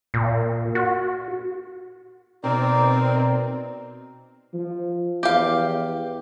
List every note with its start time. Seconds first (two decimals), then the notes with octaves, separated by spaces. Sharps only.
0.14 A#2
0.75 F#4
2.44 B2 C4 D#4 A#4 D5
4.54 F3
5.23 E2 G4 F5